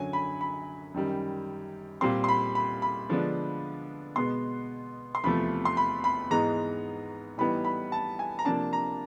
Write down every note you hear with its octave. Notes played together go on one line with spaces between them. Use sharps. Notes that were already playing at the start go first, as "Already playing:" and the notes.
Already playing: F#2 D3 F#3 G#5
B5
B5
F#2 D#3 G3
A#2 G3 C4 C6
C6
B5
B5
B5
D3 F3 G#3 B3 D4
B2 G#3 B3 C6
C6
E2 C3 F3 A3 B5
C6
B5
B5
G#2 E3 G#3 B3 D#4 A#5
A2 E3 G3 B3 D#4 B5
B5
A5
G#5
A#5
C3 F3 A#3 D4 A5
A#5